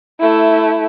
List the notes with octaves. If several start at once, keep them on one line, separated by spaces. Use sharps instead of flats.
A3 E4